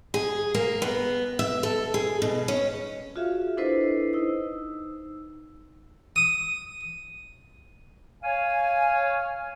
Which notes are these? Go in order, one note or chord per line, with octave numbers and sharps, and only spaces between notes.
G#4
A#3
B3
E5
A4
G#4
B2
C#4
F4 F#4 G#4 E5 F5
D4 E4 A4 B4 C5 D#5
D#4 E6
D#6
C#5 F5 G#5